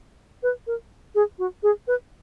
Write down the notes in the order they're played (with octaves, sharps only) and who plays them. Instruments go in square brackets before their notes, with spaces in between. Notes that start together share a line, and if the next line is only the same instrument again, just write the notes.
[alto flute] B4
A#4
G#4
F#4
G#4
B4